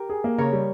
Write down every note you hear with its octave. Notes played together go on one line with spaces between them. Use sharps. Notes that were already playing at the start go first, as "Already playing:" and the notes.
Already playing: G4 A#4
G#4
A#3
C#3 A#4 C#5
G3